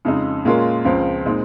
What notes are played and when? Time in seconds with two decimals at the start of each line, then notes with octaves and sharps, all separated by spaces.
0.05 F2 C#3 G#3 D#4
0.45 A#2 G#3 C#4 F4 A#4
0.85 C#2 C#3 F3 C4 F4
1.25 A#2 G#3 C4 D#4